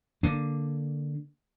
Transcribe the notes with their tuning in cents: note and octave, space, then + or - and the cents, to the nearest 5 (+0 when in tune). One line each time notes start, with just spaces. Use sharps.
D3 +0 A#3 +0 D4 +0